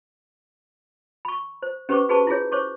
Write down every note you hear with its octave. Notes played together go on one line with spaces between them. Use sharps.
B5 C#6
C5
C#4 G4 B4 C5 C#6 D6
F#4 G#4 B4 C5 A5 C#6
E4 F4 G#4 C#5
C5 C#5 C#6 D6